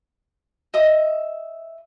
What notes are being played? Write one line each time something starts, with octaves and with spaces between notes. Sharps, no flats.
D#5 E5 D#6